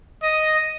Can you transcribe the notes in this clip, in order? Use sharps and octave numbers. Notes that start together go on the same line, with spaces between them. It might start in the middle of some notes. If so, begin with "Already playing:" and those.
D#5